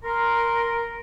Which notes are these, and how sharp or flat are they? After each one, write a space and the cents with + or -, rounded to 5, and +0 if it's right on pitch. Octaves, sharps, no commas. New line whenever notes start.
A#4 +0 C6 +0